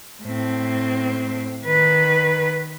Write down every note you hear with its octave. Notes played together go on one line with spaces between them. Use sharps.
A2 C4
D#3 B4